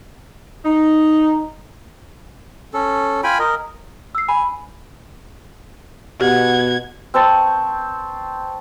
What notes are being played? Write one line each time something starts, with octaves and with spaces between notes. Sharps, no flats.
D#4
C#4 A4
F4 G5 G#5 B5
A#4 D#5
E6 C7
G#5 B5
B2 G4 F#5 G#6
C4 C5 A5 C#6